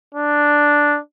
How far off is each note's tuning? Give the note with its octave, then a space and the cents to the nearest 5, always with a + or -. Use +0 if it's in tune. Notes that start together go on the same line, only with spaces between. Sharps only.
D4 +0